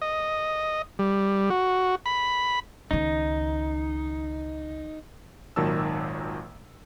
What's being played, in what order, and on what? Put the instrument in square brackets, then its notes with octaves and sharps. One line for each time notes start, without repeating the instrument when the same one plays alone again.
[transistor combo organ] D#5
G3
F#4
B5
[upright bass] C#2 D#3 [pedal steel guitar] D#4
[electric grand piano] G#1 A#2 D#3 F#3 A5 E6